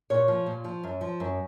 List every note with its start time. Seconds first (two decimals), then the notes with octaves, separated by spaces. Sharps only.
0.10 A#2 C#5
0.28 F3
0.46 A#2
0.64 F3
0.83 F#2
1.01 F3
1.20 F#2